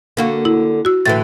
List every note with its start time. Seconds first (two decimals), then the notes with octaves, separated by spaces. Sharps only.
0.17 D3 A#3 F#4
0.45 E4
0.85 F#4 E6
1.06 A2 D3 E3 A6